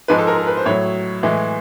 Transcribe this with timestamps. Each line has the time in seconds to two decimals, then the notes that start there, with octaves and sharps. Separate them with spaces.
0.08 G#2 F3 G#3 B4
0.19 A4
0.27 A#4
0.38 A#4
0.47 B4
0.57 C5
0.66 A2 F#3 C#5
1.23 A2 E3 G#3